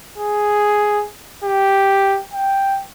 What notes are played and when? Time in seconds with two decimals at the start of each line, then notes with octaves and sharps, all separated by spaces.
0.18 G#4
1.44 G4
2.33 G5